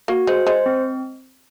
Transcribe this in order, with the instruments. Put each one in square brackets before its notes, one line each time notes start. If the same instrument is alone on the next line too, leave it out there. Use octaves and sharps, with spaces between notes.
[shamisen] A#3 [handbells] F#4
[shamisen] G#3 [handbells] C5
[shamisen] G#3 [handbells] C5
[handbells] C4